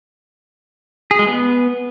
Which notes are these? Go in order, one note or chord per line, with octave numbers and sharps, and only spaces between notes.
G#4
G#3
B3